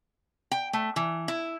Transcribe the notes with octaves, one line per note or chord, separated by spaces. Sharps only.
G5
A3
E3
E4